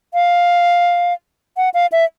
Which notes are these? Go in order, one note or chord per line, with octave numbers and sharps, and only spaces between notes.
F5
F#5
F5
E5